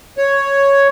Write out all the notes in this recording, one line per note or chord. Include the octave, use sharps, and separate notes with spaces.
C#5